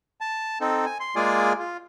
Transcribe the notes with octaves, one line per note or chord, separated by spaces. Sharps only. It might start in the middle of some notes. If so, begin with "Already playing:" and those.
A5
C4 D#4 A4
G#5
C6
G#3 A#3 F4 G#4 D5 G#5
F4